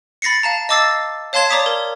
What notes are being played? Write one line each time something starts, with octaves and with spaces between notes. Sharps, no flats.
B5 A6 A#6 C7 C#7
F5 A5 A#5
D#5 A5 D6 E6 A6 C7
C#5 F5 A5 C6 G#6 E7
C#5 D5 A#5 D6 D#6 B6
A#4